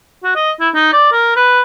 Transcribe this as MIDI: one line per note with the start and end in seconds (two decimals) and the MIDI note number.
0.24 0.34 66
0.35 0.51 75
0.60 0.69 64
0.74 0.92 63
0.93 1.12 74
1.12 1.33 70
1.36 1.61 71